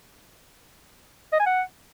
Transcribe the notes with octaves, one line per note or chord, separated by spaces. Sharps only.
D#5
G#5
F#5